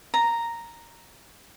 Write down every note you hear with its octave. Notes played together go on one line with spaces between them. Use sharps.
A#5